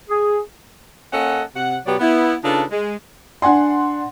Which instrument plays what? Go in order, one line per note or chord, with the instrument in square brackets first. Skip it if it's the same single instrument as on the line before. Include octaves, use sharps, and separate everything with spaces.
[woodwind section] G#4
[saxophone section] A#3 C#4 A4 D#5 F#5
C3 F#5
B2 F#3 B3 G4 C#5 D5
B3 E4
C#3 D4 D#4 F4 A4 B4
G#3
[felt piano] D4 F#5 G#5 C6